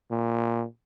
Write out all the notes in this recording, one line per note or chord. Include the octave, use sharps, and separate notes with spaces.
A#2